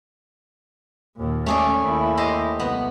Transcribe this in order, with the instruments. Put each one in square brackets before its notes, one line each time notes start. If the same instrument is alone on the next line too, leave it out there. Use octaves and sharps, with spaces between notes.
[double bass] D#2 A#2
[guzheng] A3 G#4 D5 [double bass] C#4
[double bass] D#2 E4
[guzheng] G4 C5 D#5
[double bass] C2 [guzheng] B3